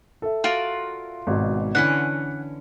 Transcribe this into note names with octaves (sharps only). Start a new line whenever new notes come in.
A4 E5
F4 F#4 A#4 D5
G#1 G#2 B2
D3 E3 C#4 F#5 B6 C#7